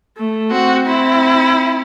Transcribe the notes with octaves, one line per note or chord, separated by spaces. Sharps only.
A3
C4 F#4
C4 E4